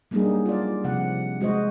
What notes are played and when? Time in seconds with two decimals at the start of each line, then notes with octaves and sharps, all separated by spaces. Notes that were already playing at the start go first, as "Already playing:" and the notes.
0.11 F#3 G3 A#3 D4 D#4 G#4
0.46 F4 D5
0.84 C3 F3 F#5
1.41 G#3 F#4 C5 D#5